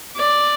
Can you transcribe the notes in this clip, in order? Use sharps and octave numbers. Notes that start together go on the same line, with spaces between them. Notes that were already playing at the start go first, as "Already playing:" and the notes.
D5